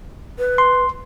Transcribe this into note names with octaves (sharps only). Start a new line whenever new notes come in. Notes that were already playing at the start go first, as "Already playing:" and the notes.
B4
C6